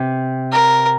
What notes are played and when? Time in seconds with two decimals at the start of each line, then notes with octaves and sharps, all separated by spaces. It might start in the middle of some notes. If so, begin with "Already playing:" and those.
Already playing: C3
0.52 A#4